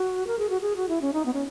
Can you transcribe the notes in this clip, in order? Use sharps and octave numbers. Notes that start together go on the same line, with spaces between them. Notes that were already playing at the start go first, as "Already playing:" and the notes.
Already playing: F#4
A#4
G#4
F#4
G#4
F#4
E4
C#4
D#4
B3
C#4